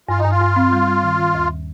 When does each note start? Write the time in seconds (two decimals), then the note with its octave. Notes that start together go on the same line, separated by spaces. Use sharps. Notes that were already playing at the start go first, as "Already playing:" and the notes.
0.09 G2 F4
0.19 D#4
0.25 G2
0.31 F4
0.41 G2
0.56 C4
0.72 G3
0.87 G3
1.03 D#3
1.19 D#3
1.35 D#2